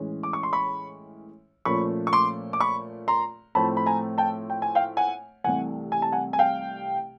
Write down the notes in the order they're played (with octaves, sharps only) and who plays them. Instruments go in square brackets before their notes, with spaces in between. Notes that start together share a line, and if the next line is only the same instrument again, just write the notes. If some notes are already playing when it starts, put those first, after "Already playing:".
Already playing: [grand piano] A2 E3 G#3 C#4
D6
C#6
C6
B5 C#6
A#2 F3 A3 C#4 B5 C#6
C#6
C6 D6
D6
B5 C#6
A#5 C6
A2 F3 A3 C4 A5 B5
B5
G#5 A#5
G5 A5
G5
G#5
F5 G5
F#5 G#5
C2 C3 E3 A3 F#5 G#5
G#5
A5
F#5 G#5
G#5
F5 G5